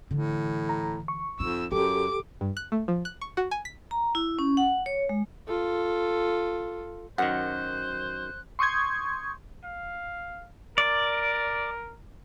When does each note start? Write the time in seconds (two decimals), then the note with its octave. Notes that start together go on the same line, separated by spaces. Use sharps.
0.11 A2 D3 E3
0.69 A#5
1.08 C#6
1.40 F2 D#4 E6
1.72 F#2 F#3 G4 A4 D6
2.41 G2
2.57 F#6
2.72 A3
2.88 F3
3.05 F#6
3.21 C#6
3.37 F#4
3.51 G#5
3.65 B6
3.91 A#5
4.15 E4
4.39 C#4
4.57 F#5
4.86 C#5
5.09 G#3
5.48 F4 A4
7.18 F#2 D#3 C5 F#5 F#6
8.59 C6 C#6 D#6 G6 G#6
9.64 F5
10.78 A#4 D5